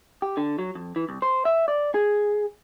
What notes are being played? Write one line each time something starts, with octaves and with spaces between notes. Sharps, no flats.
G4
D3
F#3
F2
E3
C2
C5
E5
D5
G#4